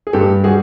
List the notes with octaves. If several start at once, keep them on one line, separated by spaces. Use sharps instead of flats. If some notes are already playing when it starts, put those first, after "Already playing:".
G#4
G2 G4 A4
G3 F#4 G#4